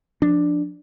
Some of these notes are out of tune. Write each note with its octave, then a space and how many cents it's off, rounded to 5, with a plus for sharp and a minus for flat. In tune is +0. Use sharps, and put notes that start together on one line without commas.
F3 +15 D4 +5